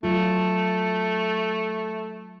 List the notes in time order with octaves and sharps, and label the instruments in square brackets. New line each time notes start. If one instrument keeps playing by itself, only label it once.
[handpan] F#3 F4 [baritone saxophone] A3